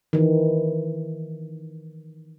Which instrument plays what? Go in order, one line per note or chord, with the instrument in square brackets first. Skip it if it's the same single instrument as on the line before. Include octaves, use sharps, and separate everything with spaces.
[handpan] D#3 E3